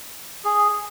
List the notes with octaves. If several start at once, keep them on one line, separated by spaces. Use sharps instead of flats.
G#4